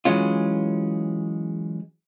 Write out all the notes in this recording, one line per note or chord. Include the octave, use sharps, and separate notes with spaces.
E3 F#3 G#3 C#4 F4